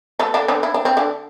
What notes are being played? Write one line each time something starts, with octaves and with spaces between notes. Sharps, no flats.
A3 A4
D3 D4
D3 D4
E4
D4
C4
D3 D4